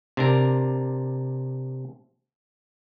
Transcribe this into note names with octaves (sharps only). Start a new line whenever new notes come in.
C3 D4 A#4